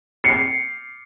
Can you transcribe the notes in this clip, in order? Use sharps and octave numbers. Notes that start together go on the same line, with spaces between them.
C7 C#7